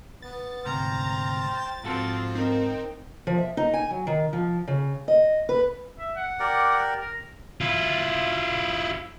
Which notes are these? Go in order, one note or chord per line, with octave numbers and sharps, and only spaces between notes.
B3 A6
D2 G#2 C3 C5 G5 A#5 F6
G#2 F3 C4 F4 F#4 A4
C4 D#4 A#4
F3
E5
D#4
G#5
F#3
D#3
F3
C#3
D#5
B4
E5
F#5
G4 A#4 D5
A#4
E4 F4